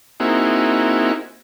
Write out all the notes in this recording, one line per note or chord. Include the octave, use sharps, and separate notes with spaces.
A#3 C4 D#4 E4 F#4 G#4